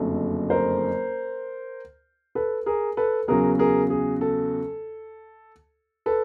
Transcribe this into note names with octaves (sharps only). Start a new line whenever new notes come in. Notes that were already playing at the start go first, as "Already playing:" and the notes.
Already playing: F#1 F2 D3 F#3 A3
A#4 C5
A4 B4
G#4 A#4
A4 B4
E2 C#3 F#3 G#4 A#4
G#4 A#4
G#4
A4
A4 B4